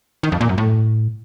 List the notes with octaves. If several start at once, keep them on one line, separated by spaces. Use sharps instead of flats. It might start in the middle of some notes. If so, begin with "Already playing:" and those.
D#3
F2
A#2
F#2
A2